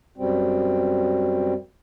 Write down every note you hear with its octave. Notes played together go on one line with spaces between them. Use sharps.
F#2 B2 G3 C4